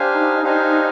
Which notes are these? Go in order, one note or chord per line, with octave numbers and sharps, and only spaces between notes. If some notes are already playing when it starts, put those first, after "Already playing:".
Already playing: D4 G4 C5 F5 G#5
D#4
D4 D#4 G4 C5 F5 G#5